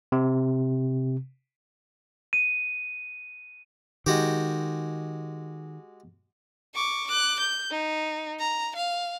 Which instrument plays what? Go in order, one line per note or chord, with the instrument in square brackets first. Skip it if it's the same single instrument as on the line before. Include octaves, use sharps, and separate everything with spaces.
[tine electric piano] C3
[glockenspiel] D#7
[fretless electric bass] D#3 [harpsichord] G#3 F#4 G4
[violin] C#6 D6
D6 F#6
G6
D#4
A#5
F5